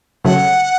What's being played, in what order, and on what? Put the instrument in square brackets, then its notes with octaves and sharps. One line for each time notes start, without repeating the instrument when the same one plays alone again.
[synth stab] C#3 F#3 A3 [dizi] F#5